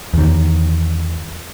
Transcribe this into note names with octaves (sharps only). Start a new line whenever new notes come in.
E2 D#3